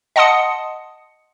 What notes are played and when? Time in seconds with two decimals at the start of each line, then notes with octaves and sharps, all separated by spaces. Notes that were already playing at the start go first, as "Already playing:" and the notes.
0.16 D#5 F#5 A5 C6 D#6 C#7